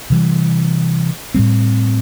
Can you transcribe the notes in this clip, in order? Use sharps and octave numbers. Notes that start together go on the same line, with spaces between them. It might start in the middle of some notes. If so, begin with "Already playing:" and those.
C3 E3 G3
A2 G3 C4